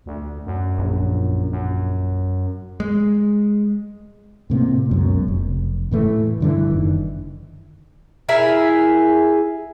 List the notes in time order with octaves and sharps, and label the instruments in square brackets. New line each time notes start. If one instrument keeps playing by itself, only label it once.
[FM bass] D2
F#2
[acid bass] A#1
[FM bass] F#2
[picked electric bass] G#3
[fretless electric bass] A2 C3 A#3
C#2 F#2 B2
F1
A2 E3 A3
G2 D3 E3
F#1 D#3
[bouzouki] E4 G#4 A#4 E5